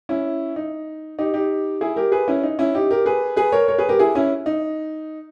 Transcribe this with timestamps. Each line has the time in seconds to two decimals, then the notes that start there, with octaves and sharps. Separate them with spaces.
0.09 C#4 E4
0.56 D#4
1.19 D#4 G4
1.34 D#4 G4
1.81 E4 G#4
1.96 G4 A#4
2.12 G#4 B4
2.28 C#4 E4
2.43 D#4
2.59 C#4 E4
2.74 D#4 G4
2.90 G4 A#4
3.06 G#4 B4
3.36 G#4 B4
3.52 A#4 C#5
3.68 A#4 C#5
3.78 G#4 B4
3.89 G4 A#4
3.99 E4 G#4
4.15 C#4 E4
4.46 D#4